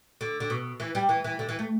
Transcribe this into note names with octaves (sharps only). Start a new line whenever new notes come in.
D3
D3
B2
E3
G3
E3
E3
D3
E3
A3